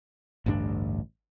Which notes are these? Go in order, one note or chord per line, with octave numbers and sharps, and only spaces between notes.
A1 D2 G2 D4